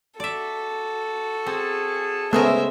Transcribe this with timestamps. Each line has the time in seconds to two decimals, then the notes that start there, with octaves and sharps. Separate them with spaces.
0.20 F#4 A4 D5 E5
1.46 C4 G#4 A5
2.33 C#3 G#3 A3 B3 A#4 C5 E5